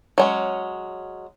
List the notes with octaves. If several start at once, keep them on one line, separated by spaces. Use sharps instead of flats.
F#3 G#3 C#4